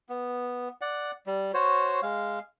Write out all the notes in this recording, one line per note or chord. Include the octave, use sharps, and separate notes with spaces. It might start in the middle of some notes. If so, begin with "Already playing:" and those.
B3
D5 F#5
G3
F#4 C5 C#5
G#3 F5